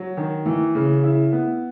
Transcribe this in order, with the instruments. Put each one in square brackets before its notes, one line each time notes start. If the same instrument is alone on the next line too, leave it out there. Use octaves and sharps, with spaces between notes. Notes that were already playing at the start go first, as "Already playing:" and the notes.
Already playing: [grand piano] F#3
D#3
E3
C#3
E4
B3